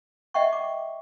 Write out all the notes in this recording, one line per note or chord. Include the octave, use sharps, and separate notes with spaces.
D#5 E5 F#5 G5 C#6
D6